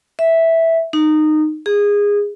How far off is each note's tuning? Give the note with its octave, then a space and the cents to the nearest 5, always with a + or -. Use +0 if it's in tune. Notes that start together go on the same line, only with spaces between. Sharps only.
E5 -5
D#4 -20
G#4 -20